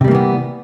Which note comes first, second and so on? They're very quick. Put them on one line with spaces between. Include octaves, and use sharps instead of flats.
C3 G3 A#3 E3 B3